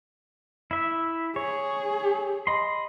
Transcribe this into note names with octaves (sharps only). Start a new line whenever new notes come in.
E4 E5
G#4 C#5
D#5 B5 C6